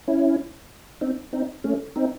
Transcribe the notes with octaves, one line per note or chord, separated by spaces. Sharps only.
C#4 E4
C4 D#4
C4 D#4
A3 C#4
C4 D#4